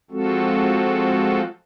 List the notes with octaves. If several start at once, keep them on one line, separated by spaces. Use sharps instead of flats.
F3 G#3 C4 F4 F#4 A4